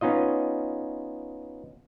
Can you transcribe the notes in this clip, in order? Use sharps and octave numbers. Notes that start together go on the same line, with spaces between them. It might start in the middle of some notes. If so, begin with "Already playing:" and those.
B3 C#4 D#4 F4 D#5